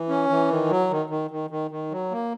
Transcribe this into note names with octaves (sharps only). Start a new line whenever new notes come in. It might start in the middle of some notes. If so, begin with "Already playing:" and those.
Already playing: E3
C#4
E3
D#3
F#3
D#3
D#3
D#3
D#3
D#3
F#3
A#3